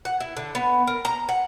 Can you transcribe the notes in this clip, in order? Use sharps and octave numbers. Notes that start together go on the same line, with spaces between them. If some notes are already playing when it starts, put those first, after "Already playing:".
F#5
E4
D3
B3
A#4
A#5
F#5